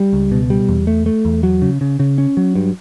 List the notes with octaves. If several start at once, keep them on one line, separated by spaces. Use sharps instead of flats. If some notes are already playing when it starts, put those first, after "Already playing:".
Already playing: G3
C#2
B2
G3
E2
A3
A3
E2
F#3
C#3
C#3
C#3
C#4
F#3
G2